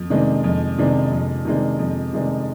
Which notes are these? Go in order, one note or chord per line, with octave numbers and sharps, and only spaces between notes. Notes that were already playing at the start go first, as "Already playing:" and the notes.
Already playing: F2
C3 D#3 G#3 D4
F2
C3 D#3 G#3 D4
F2
C3 D#3 G#3 D4
F2
C3 D#3 G#3 D4